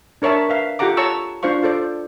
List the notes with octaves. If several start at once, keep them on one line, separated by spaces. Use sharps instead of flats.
D4 A#4 C#5 E5 A5
B4 E5 F5
F4 G4 A4 F#5 A#5 D6
C#5 A5 A#5 C#6 E6
D4 F4 C5 F5 C#6
F4 A4 C5 D5